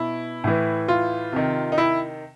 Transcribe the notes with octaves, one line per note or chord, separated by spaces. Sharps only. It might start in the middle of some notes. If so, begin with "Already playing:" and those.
Already playing: B2 E4
A2 E3
F4
C3 D#3
D#4
E4